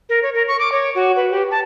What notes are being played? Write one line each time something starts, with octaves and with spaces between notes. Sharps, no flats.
A#4
C#5
A#4
C#6
D6
C#5
F#4
B4
G4
A5